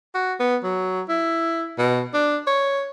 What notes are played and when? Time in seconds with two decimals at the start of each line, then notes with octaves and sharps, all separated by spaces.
0.15 F#4
0.40 B3
0.63 F#3
1.09 E4
1.78 B2
2.14 D4
2.47 C#5